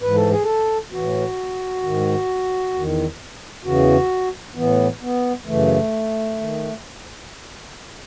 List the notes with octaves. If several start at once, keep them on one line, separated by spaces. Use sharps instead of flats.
G#2 E3 B4
A4
G#4
A4
A2 E3 F#4
G#2 D#3
E2 D#3
E2 C#3 E3 F#4
A2 E3 B3
B3
F#2 C#3 E3 A3
D#3